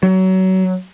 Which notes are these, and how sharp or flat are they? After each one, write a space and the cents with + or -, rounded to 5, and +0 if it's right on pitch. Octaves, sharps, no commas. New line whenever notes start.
F#3 +25